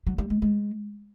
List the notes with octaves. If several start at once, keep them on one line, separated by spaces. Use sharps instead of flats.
F#3
G3
G#3
G#3